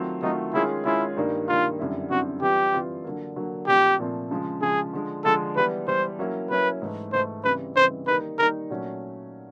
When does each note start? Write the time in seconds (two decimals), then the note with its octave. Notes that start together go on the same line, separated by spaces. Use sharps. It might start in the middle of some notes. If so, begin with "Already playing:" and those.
Already playing: D#3 F#3 A3 C4 F4
0.22 D#3 F#3 A3 C4 D#4 F4
0.53 D#3 G#3 C#4 E4 F4 G#4
0.85 D#3 G#3 C#4 E4 F4 G#4
1.17 G2 D#3 G3 A#3 D#4
1.48 G2 D#3 G3 A#3 D#4 F4
1.79 F#2 D3 G3 C4 E4
2.11 F#2 D3 G3 C4 E4 F#4
2.42 E3 G3 C4 F4 G4
2.73 E3 G3 C4 F4
3.04 D3 F#3 A#3
3.36 D3 F#3 A#3
3.67 A#2 F3 A3 C4 G4
3.99 A#2 F3 A3 C4
4.31 C#3 F3 G#3
4.62 C#3 F3 G#3 G#4
4.93 D3 F3 G#3
5.25 D3 F3 G#3 A4
5.56 E3 G3 B3 B4
5.87 E3 G3 B3 C5
6.19 F#3 A#3 C#4 E4
6.50 F#3 A#3 C#4 E4 B4
6.82 G#2 E3 A3
7.12 G#2 E3 A3 C5
7.44 C#3 E3 G3 C4 B4
7.76 C#3 E3 G3 C4 C5
8.07 D#3 G3 A#3 D#4 B4
8.38 D#3 G3 A#3 D#4 A#4
8.70 A#2 F#3 A3 C#4